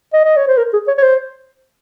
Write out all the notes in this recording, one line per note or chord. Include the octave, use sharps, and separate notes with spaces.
D#5
D#5
C#5
C5
A#4
G#4
C#5
C#5
C5